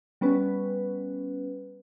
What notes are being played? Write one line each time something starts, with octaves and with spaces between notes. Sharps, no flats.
G3 B3 C#4 B4